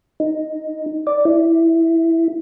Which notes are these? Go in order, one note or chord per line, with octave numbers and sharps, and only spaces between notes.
D#4
D5
E4